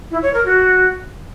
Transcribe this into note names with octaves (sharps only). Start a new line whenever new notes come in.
E4
C#5
A#4
F#4